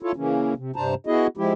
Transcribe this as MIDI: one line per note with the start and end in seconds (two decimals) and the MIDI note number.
0.03 0.12 64
0.03 0.12 65
0.03 0.12 69
0.03 0.12 73
0.16 0.54 49
0.16 0.54 52
0.16 0.54 58
0.16 0.54 61
0.57 0.71 48
0.76 0.94 43
0.76 0.94 48
0.76 0.94 62
0.76 0.94 72
0.76 0.94 81
0.76 0.94 82
1.07 1.27 59
1.07 1.27 64
1.07 1.27 66
1.07 1.27 68
1.07 1.27 75
1.37 1.53 53
1.37 1.53 56
1.37 1.53 64
1.37 1.53 67